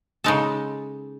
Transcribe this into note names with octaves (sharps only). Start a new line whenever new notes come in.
C#3 G#3 D#4 A4